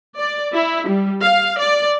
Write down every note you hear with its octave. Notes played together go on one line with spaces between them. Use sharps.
D5
E4
G3
F5
D5